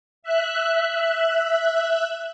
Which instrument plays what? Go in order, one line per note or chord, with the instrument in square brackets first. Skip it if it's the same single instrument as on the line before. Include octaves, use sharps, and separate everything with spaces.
[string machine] E5 F#6